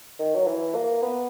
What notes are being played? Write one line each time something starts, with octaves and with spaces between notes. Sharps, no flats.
D#3
F#3
E3
A#3
B3